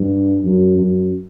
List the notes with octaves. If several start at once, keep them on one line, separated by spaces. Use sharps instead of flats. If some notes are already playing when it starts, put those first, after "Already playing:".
Already playing: G2
F#2
F#2